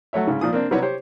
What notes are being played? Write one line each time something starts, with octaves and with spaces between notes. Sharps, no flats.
F#3 A3 C#5 E5
G#2 C#3
A#2 F3 D#6
A#3 C4 D4
C3 F#3 G3 E4 B4 C#5
G4 C5 C#5